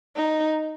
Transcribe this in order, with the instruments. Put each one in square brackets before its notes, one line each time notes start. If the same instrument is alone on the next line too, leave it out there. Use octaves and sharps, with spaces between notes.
[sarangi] D#4